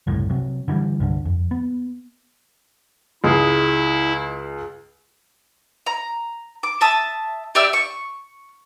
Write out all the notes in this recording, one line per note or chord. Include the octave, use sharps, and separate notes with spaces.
F#1 C2 A2
C3 F#3
D3 E3 F#3 G3
C2 G2 D3
F2
B3
C#2 G#3 E4 D#6
A#5
D6
E5 A5 D#6
G4 D5 E5 E6
C#6